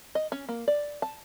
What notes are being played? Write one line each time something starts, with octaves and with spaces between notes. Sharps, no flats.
D#5
C#4
A#3
D5
A5